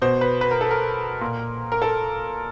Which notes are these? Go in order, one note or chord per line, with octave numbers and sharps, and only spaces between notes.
B2 C5
B4
B4
A#4
A4
A#4
A#2
A#4
A4